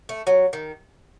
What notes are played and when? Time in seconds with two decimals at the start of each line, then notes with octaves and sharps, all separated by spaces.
0.09 A3
0.27 F#3
0.53 D#3